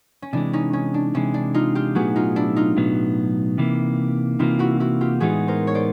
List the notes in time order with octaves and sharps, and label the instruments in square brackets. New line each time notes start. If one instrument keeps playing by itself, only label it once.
[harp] C#4
[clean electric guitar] C3 E3 G#3 [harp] D4
[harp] C#4 D#4
C#4
D4
[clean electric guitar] C3 E3 G#3 [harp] C#4
[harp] D4
D#4 F4
F4 G4
[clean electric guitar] B1 A2 F#3 B3 [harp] F#4 G#4
[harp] D#4 F4
D4 E4
D#4 F4
[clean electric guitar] B1 A2 F#3 B3
C3 E3 G3 A#3
[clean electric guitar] C3 E3 G3 A#3 [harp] D#4 F4
[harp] E4 F#4
E4 F#4
F4 G4
[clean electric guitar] A2 E3 G#3 B3 D#4 [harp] F#4 G#4
[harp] A#4 C5
C#5
C5 D5